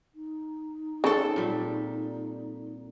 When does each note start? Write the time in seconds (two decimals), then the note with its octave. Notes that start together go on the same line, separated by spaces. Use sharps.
0.15 D#4
1.04 C#3 C4 D4 A4 A5
1.36 A#2 G3